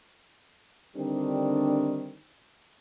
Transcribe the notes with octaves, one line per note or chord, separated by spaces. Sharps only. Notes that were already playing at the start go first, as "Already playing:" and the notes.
D3 D#3 G3 C4 D4 G4